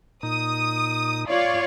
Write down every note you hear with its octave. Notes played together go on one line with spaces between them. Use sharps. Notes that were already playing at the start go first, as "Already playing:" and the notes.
A#2 D#4 D#6
F4 C#5 D5